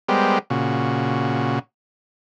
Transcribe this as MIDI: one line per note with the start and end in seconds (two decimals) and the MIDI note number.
0.09 0.39 55
0.09 0.39 56
0.09 0.39 59
0.09 0.39 67
0.09 0.39 70
0.09 0.39 72
0.50 1.59 46
0.50 1.59 49
0.50 1.59 66